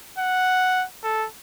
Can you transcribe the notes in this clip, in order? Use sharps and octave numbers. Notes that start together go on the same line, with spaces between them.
F#5
A4